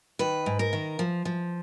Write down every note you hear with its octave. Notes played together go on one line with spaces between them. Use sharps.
D#3 B4
G#2
A#4
D#3
F3
F3